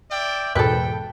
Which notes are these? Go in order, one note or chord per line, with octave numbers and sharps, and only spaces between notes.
D5 E5 G5
E2 G#2 B2 A4 B4 G5